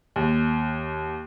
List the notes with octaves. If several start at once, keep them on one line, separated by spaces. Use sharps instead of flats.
D#2